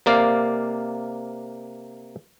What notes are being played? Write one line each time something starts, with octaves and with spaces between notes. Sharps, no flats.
C3 A#3 D5 F5